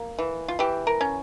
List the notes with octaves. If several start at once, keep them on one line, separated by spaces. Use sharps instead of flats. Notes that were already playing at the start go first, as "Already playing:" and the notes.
Already playing: A#3
E3
F4
E3 G4
A#4
C#4